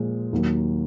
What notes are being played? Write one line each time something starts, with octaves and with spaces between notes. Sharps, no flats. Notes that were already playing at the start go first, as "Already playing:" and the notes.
Already playing: A#2 F3 G#3
D#2 D#3 F#3 A#3